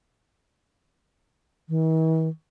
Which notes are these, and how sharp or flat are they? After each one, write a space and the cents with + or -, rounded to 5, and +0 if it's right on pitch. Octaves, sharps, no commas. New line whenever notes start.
E3 -45